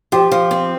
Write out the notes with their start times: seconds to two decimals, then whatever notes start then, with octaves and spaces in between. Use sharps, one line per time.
0.12 F3 G4
0.32 F3
0.51 C4